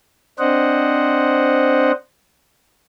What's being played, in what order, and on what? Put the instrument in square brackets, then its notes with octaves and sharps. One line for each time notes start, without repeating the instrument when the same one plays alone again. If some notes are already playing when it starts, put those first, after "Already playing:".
[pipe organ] C4 D4 C5 D#5 F#5